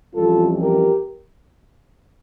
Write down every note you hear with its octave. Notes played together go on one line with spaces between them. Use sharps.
F2 E3 G3 C#4 F4 A4
G4 A#4